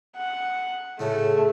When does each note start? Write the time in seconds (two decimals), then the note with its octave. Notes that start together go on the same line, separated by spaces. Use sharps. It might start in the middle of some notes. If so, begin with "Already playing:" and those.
0.17 F#5
1.00 A2 C#3 A3